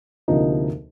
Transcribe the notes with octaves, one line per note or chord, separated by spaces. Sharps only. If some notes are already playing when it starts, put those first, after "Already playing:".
D2 C3 F3 A#3 D#4